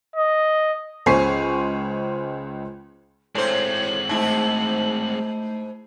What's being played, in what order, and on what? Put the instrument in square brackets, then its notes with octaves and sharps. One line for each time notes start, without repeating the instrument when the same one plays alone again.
[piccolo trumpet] D#5
[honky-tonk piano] C#2 C#3 C5 G#5 C#6 C7
[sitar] A2 C5 [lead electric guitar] G#3 C4 [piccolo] F#7
[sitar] G#2 E4 [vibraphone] A3